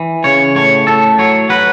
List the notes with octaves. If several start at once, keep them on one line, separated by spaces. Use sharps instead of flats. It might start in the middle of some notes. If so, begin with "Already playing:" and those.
Already playing: E3
C#3 C#5
A2 C#5
A2 A4
F#3 C#5
F#3 B4